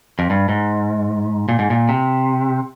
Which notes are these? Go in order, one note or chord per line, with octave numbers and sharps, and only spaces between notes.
F2
G2
G#2
A#2
G#2
A#2
C3